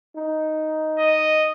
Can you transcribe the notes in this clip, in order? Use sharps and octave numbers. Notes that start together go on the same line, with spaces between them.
D#4
D#5